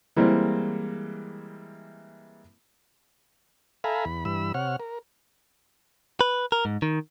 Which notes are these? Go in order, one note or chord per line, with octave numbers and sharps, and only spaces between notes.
E3 G3 G#3 A#3 C4
A4 E5 F5 G#5 A#5 B5
E2 B5
G2 E3 B5 E6
C3 C#5 F#5 F6
A#4
B4
A#4
G#2
D#3